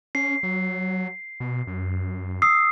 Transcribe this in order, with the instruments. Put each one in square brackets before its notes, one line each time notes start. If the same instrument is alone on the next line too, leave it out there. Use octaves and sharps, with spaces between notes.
[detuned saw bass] C#4 [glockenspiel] C7
[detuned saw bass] F#3
B2
F#2
[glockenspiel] D#6 E6 C7